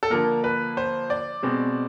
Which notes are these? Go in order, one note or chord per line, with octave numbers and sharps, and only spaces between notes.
A4
D3 F3 A#3 A#4
B4
C5
D5
B2 G#3 C4